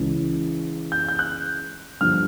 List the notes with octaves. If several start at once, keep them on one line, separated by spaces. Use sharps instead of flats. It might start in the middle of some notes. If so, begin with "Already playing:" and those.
Already playing: C#2 C#3 E3
G6
G6
F#6
G2 D3 F3 F6